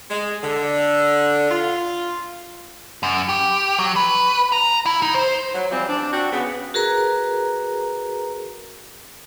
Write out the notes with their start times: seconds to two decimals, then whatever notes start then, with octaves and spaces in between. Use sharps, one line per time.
0.10 G#3
0.43 D3
1.51 F4
3.03 F#2
3.29 G4
3.79 F#3
3.96 B4
4.52 A#5
4.86 E4
5.02 D#4
5.15 C5
5.54 F#3
5.71 E3 F3 G3 C4
5.88 D4
6.11 C4 D4 F#4
6.31 C#3 B3
6.74 F#4 G#4 A#4 B4 A#5